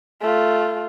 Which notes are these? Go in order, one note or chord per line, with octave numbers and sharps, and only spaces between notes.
A3 F4